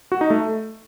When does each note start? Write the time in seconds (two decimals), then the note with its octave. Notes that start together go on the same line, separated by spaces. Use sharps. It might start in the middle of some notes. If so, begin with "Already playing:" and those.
0.12 F#4
0.21 D#4
0.30 A3